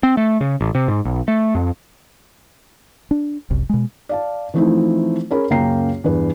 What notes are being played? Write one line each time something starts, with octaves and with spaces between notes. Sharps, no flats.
C4
A3
C#3
A1
C3
G#2
B1
A3
F2
D4
F#1 C2
B2 G#3
D5 F5 A5
E3 F3 A3 C4 D#4 E4
C#4 G#4 A#4 C#5 B5
C#2 F#2 A#3 G5 A#5 C7
E2 G2 B4